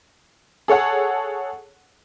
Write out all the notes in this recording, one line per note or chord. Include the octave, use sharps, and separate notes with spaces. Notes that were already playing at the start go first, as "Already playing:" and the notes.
G#4 A4 C#5 F#5 A5